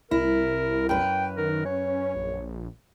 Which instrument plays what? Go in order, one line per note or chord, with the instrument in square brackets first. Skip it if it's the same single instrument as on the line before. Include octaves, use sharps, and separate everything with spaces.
[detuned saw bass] C2 [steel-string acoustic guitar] E4 [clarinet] A#4
[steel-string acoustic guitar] F#2 B4 [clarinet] G5
[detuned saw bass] D#3 [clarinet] A#4
[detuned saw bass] C#4 [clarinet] C#5
[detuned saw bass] A#1